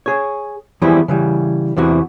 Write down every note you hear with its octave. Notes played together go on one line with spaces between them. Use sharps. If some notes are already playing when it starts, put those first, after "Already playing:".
G#4 C#5
E3 F3 G3 B3 E4 G#4
C#3 E3 G3
E2 C3 E3 F#4